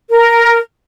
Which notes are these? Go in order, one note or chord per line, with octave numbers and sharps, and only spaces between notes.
A#4